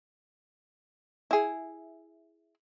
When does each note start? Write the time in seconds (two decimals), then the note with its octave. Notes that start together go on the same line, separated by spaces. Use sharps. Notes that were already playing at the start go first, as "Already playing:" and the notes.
1.31 E4 G#4